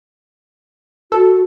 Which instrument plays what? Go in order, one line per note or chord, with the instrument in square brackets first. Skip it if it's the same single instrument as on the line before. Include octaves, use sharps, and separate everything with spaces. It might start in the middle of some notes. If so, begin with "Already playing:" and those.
[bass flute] F#4 [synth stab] A4